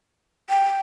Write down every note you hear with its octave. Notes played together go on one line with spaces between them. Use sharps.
G5